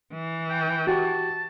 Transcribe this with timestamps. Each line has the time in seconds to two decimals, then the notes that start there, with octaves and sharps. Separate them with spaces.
0.12 E3
0.50 G5
0.87 F#4 G4 A5